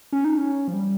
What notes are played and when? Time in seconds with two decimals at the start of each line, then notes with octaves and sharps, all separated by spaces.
0.12 C#4
0.24 D#4
0.37 C#4
0.68 F3
0.73 G3